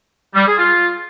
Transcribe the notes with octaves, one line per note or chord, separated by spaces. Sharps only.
G3
G#4
F4